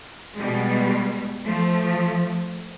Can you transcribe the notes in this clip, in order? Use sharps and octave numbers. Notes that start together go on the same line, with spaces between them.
B2 G3 G#3
F3 A3